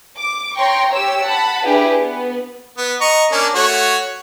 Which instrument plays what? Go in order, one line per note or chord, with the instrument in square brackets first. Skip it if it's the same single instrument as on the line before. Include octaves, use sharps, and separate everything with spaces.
[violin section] D6
C#5 G5 A#5 C6 C#6
G4 C#5 E6
F#5 A5 B5
D4 E4 G4 G#4 B4
B3
[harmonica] B3
D#5 A#5 C#6
A#3 C#4 D4
A3 F#4 C#5